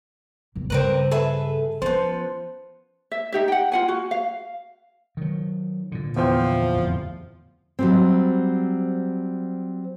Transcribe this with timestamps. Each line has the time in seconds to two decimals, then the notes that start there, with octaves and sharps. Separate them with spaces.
0.55 D#2 A#2
0.70 G2 C#3 C4 A#4 B4
1.11 G#4 A4 B4 E5
1.82 F3 B3 C#4 C5
3.12 E5
3.32 D#4 G4 E5
3.48 F#5 G5
3.72 F4 F#5 G#5
3.88 F#4
4.11 F5
5.17 D#3 F#3
5.92 A#2 D3
6.16 E2 F3 C5 G5
6.76 D1 F2
7.79 F#3 G3 C4